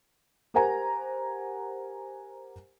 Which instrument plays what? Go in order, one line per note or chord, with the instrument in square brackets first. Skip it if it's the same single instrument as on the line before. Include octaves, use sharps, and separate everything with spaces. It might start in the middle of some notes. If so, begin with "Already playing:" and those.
[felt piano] G4 A#4 C5 F#5 G#5 A#5